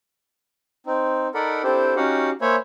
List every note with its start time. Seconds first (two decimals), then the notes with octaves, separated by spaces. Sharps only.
0.86 C4 D#4
1.34 D#4 A4 A#4 D5 F#5 B5
1.64 C4 D4 E4 G4 A4 C5
1.96 C#4 D#4 F#4 G4 F5 F#5
2.41 A#3 C5 C#5 E5 G#5 B5